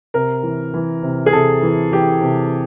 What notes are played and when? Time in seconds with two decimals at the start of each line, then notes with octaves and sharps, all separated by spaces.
0.14 C3 A#4
0.43 E3
0.74 E3
1.03 C3
1.26 G#4
1.33 C3 A4
1.62 E3
1.92 E3 G4
2.21 C3